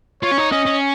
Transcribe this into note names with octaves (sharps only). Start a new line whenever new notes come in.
F4 C#5
C#4
D#4
C#4 D#5
C#4